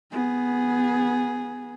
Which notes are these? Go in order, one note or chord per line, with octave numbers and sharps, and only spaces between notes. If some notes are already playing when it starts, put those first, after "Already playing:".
B3 G#4